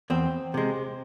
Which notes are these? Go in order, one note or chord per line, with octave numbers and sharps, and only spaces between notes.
E2 C4
C3 G#3